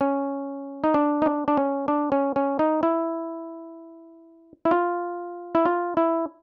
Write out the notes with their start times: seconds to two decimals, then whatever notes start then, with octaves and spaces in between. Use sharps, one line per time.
0.01 C#4
0.84 D#4
0.94 D4
1.22 D#4
1.26 D4
1.48 D4
1.57 C#4
1.88 D4
2.12 C#4
2.36 C#4
2.59 D#4
2.83 E4
4.65 E4
4.71 F4
5.55 E4
5.65 F4
5.97 E4